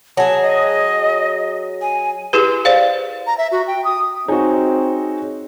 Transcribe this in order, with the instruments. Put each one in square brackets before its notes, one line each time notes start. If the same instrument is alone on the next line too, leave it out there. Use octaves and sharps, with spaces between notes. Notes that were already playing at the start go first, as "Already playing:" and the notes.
[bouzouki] F#3 G#4 [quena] A5
[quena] D#5
G#5
[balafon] E4 G4 G#4 B4
C5 D5 F5
[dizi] A#5
E5
F#4
G5
D#6
[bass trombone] C4 [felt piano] D#4 F#4 [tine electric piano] G#4 C#5 G#5